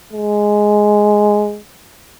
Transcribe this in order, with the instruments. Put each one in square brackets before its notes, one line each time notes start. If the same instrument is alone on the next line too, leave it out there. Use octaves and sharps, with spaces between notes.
[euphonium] G#3